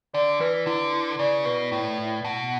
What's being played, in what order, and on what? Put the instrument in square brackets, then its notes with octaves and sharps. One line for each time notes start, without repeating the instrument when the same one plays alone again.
[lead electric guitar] D3 [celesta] D5
[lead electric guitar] E3 [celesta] B4
[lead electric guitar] D3 [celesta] E4
[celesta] E4
[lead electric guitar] C#3 [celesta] D5
[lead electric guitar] B2 [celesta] B4
[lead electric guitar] A2 [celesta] E4
[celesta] E4
[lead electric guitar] B2 [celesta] A5